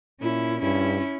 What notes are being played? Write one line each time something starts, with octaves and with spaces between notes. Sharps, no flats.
A#2 C#4 E4
G2 C#4 E4